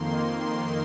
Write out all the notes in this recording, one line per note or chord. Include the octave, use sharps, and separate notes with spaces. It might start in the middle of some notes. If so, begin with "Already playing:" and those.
Already playing: F2 D#3 A#3 C6